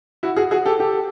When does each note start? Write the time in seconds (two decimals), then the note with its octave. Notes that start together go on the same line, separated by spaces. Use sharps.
0.23 E4 F#4
0.36 F#4 G#4
0.51 F#4 G#4
0.65 G4 A4
0.79 G4 A4